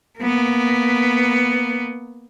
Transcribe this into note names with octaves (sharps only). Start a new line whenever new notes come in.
A#3 B3